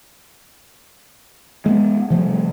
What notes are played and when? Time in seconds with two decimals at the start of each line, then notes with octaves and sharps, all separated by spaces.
1.66 G#3 A3 B3
2.10 C3 F3 G3 A3